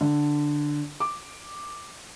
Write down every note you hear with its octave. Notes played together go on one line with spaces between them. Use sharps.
D3
D6